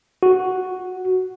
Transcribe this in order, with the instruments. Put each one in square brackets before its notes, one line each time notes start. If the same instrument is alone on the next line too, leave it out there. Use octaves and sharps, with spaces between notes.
[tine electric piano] F#4